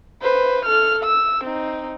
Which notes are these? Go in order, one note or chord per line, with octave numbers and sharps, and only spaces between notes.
B4 C5
A4 F6
E6
C4 D#4